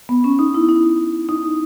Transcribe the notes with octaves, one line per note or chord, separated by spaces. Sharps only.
B3
C#4
D#4
E4
D#4
D#4